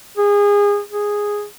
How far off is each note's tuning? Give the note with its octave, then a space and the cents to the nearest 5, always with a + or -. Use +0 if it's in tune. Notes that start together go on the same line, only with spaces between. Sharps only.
G#4 -25
G#4 -5